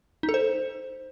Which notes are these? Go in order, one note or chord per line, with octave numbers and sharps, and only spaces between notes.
D#4
A4
C5